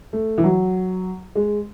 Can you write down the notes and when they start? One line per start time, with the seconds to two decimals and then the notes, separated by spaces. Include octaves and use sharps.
0.13 A3
0.38 E3
0.44 F#3
1.35 G#3